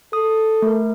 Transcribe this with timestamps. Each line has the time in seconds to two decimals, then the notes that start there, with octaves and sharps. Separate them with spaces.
0.13 A4 D#6
0.62 A3 A#4